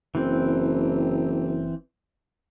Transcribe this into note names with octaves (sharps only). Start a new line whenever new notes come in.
F#1 E3 C4